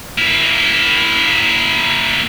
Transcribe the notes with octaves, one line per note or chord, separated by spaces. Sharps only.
A#3 E4